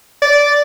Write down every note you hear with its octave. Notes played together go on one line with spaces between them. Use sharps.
D5